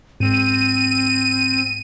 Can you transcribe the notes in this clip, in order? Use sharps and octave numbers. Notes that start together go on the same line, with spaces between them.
G#2 C4 D#7